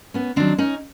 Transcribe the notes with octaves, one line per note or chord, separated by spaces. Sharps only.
B3 C#4
D#3 F#3 C4 D4
C#4 D#4